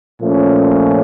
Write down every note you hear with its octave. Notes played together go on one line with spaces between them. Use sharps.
A#2 F3 A3 C#4